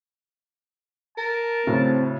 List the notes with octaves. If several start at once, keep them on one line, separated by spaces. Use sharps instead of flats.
A#4 A5
A2 C#3 F#3 C4